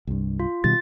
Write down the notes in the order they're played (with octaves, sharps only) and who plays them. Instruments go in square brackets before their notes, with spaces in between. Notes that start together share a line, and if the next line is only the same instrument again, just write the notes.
[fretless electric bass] C2 G2
[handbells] F4
[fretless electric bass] B2 D#3 G3 [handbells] A6